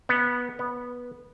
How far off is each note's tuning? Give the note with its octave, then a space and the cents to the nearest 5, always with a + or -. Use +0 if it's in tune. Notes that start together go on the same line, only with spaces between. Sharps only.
B3 -15
B3 -15